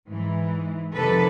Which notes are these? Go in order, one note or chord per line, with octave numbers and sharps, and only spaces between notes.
G#2 E3
F2 C3 D#3 A4 B4